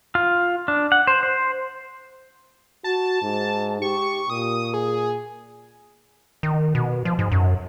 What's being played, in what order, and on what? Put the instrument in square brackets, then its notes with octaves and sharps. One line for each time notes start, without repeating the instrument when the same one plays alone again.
[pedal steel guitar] F4
D4
F#5
C5
C5
[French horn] F#4 [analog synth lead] A5
[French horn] G#2
[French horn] G4 [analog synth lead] C#6
[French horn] A#2 [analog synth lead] D#6
[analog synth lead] G#4
[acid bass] D#3
B2
F3
G#2
F#2